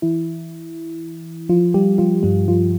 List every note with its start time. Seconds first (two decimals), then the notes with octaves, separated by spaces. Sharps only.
0.02 E3 E4
1.49 F3 F4
1.74 G3 G4
1.98 F3 F4
2.23 G2 G3
2.48 F3 F4